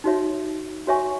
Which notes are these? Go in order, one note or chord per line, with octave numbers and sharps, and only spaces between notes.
D#4 F#4 C#5 E5
F#4 C#5 E5 G#5 C#6